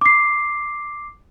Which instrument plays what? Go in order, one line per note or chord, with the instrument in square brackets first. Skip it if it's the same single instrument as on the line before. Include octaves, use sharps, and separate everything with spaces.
[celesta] D6 C7